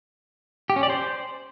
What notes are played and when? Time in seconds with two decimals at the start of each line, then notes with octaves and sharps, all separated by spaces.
0.70 G4
0.76 C#4
0.83 D5
0.90 C5